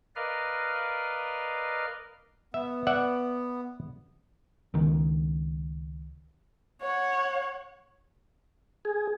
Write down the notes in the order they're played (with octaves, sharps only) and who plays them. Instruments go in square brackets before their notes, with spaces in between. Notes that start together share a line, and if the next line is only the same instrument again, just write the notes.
[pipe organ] A#4 B4 D5 D#5 F5 F6
[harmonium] B3 [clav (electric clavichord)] E5
[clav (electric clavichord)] D5 E5 F#5
[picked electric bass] C#2 D#3
[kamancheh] C#5 F#5
[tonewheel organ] G#4